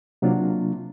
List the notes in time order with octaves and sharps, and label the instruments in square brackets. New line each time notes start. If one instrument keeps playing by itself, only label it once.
[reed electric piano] C3 F#3 A#3 D4 F4